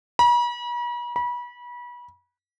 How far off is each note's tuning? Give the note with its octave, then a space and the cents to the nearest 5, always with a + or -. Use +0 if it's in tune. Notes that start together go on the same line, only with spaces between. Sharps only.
B5 -45
B5 -30